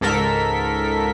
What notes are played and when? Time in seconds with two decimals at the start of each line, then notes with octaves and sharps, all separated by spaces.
0.01 C#2 G#2 A4 A#4 B6